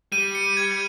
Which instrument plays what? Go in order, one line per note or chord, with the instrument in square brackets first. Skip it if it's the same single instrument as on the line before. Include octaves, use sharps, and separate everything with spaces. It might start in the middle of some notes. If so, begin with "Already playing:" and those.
[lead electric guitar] G3 [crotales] D#7
[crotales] C#7
G#6